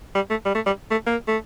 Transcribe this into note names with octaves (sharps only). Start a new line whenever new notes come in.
G3
A3
G3
A3
G3
A3
A#3
A3